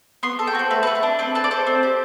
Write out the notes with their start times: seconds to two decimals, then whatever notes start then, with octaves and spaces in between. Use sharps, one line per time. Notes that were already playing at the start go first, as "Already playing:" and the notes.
0.23 B3 C6
0.39 A4
0.47 G5
0.55 F#4 C5
0.70 A3 B4
0.83 B4
0.87 A3
0.95 B4
1.03 D4
1.19 C4 B4
1.35 A4 B4
1.44 D5
1.51 A4 C5
1.67 C4
1.83 G4